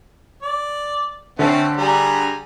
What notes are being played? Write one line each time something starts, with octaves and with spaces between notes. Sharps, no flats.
D5
D3 A3 C4 C#4
G3 G#4 A#5